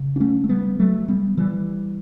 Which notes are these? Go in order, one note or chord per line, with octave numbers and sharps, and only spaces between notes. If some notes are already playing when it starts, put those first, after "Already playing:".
Already playing: C#3
D4
A3 C#4
A3
G3 B3
F#3 A3
G3 B3
E3 G3